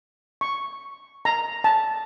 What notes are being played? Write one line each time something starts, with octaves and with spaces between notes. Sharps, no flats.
C#6
A#5
A5